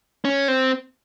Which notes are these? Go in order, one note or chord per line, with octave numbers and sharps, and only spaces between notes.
C#4
C4